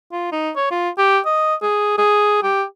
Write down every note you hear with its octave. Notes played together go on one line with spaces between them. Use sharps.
F4
D#4
C#5
F4
G4
D#5
G#4
G#4
G4